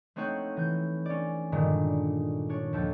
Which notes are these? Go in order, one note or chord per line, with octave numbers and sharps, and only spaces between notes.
A3 C4 D#4 C#5 F#5 G6
E3 G6
C#4 D5
G2 A#2 D3 D#3 G#3
D4 C#5
D#2 F3 A4 G6